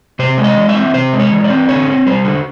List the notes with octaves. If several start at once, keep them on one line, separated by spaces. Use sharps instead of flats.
C3 C5
G#3
D#5
E3
E5
C4
C3 C5
G#3
C#5
E3
D5
C4
D3 C#5
C4
G3 C5
D3